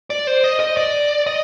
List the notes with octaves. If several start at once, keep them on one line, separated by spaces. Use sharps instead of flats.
D5
C5
D#5
D#5
D5
D#5